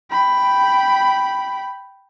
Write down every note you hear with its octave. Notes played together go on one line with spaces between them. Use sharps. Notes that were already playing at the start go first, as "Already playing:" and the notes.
G5 B5